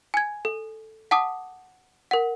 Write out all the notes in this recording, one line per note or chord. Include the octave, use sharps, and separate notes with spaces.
G#5 G#6
A4
F#5 A5 D6 D#6
A#4 F#5